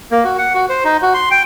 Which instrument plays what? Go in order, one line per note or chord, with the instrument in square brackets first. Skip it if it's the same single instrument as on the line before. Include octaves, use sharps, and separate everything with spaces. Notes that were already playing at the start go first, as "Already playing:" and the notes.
[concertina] A#3
F#4
F#5
F#4
C5
D#4
F#4
C6
G5